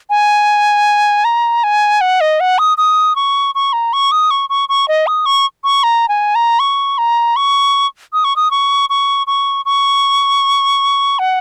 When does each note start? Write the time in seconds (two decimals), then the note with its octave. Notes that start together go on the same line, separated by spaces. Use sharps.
0.10 G#5
1.24 A#5
1.63 G#5
2.01 F#5
2.21 D#5
2.40 F#5
2.58 D#6
2.77 D#6
3.16 C#6
3.55 C#6
3.73 A#5
3.93 C#6
4.11 D#6
4.30 C#6
4.49 C#6
4.69 C#6
4.88 D#5
5.07 D#6
5.26 C#6
5.64 C#6
5.83 A#5
6.08 G#5
6.35 A#5
6.59 C#6
6.98 A#5
7.36 C#6
8.13 D#6
8.24 C#6
8.36 D#6
8.51 C#6
8.90 C#6
9.27 C#6
9.65 C#6
11.19 F#5